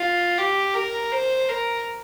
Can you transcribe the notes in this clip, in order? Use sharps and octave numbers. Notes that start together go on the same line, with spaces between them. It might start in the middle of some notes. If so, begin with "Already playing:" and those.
Already playing: F4
G4
A#4
C5
A#4